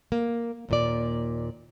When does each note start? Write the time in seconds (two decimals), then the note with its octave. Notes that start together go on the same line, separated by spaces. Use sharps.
0.12 A#3
0.69 D#2 A#2 D5